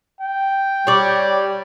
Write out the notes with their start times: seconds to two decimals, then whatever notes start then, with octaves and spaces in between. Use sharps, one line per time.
0.21 G5
0.87 G3 C#5 D5